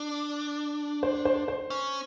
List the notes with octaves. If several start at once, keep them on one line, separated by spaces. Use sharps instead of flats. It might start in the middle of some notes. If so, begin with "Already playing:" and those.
Already playing: D4
C5
C5
C5
C#4